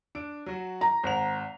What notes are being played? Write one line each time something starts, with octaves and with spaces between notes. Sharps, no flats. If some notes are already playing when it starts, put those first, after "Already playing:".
D4 D7
F#3 F#4
A#5
G#1 F#5 F7